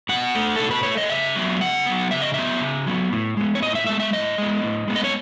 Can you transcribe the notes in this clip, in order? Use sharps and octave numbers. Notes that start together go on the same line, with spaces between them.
B2 F#5
A3
B2 A4
B4
A3 C#5
D#5
C#3 E5
F#3 B3
C#3 F#5
F#3 B3
C#3 E5
D#5
F#3 B3 E5
C#3
F#3 B3
A2
G#3 B3
C#5
A2 D#5
E5
G#3 B3 E5
E5
A2 D#5
G#3 B3
A2
G#3 B3
D#5
C#5